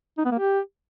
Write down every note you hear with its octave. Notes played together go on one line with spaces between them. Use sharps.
D#4
B3
A#3
G4